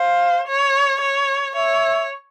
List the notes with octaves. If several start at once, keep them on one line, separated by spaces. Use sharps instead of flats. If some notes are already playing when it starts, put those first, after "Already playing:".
Already playing: C5 F5
C#5
C#5
C#5 E5